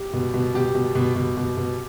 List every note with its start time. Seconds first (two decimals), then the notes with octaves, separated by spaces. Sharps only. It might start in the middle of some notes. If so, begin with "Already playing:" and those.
Already playing: G4
0.13 B2
0.34 B2
0.54 B2 G4
0.75 B2
0.95 B2
1.16 B2
1.37 B2
1.57 B2